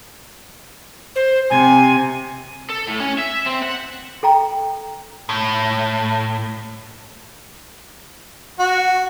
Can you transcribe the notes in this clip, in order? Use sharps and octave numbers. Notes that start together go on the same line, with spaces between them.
C5
C3 G#5
A4
A2
C#4
E5
C4
F#5
A4 G5 A#5
A2
F#4